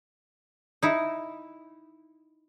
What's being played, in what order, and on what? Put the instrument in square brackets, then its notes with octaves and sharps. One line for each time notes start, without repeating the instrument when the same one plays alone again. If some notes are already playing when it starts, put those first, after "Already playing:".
[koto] D#4 E4